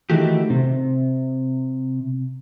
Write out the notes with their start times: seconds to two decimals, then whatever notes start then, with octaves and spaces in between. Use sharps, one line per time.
0.10 D#3 E3 A3 F#4 G4
0.50 C3